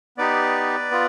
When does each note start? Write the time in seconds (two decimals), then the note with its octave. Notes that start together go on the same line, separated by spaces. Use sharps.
0.17 B3 D#4 G4 B4 D5
0.91 B3 F4